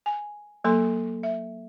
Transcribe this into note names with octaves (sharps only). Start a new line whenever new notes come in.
G#5
F#3 A#3 A4 C6
E5